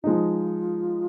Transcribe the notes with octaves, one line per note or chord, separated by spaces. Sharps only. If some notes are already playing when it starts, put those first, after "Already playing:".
F3 G#3 D#4 F4